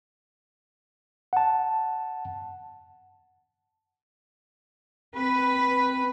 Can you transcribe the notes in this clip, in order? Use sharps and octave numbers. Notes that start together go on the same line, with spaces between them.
F#5 A5
C4 B4